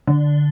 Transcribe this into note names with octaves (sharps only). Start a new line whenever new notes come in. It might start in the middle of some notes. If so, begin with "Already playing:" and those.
D3